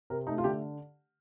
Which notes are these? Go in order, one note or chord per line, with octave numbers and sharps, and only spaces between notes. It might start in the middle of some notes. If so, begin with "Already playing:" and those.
C3 A#4
A3 D#4
F4
D3 G4